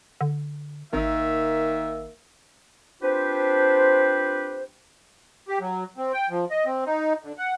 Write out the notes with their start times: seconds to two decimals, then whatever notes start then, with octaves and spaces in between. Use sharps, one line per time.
0.21 D3
0.93 G#1 D#3 A#3 E5
3.02 C4 D4 F4 G4 B4 C5
5.48 G4
5.60 F#3
5.98 C4
6.12 G5
6.30 F3
6.50 D#5
6.66 C4
6.86 D#4
7.24 D3
7.38 F#5